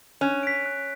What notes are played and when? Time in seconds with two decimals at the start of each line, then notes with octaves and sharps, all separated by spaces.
0.21 C#4 F#6
0.43 B6 D7
0.66 F#6